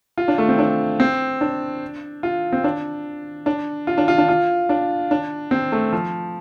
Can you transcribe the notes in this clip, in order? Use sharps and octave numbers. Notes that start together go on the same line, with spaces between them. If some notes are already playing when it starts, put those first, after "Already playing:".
F4
D4
A3
C4
D4
C4
D4
F4
C4
D4
D4
F4
D4
F4
D4
F4
D4
D4
C4
A3
F3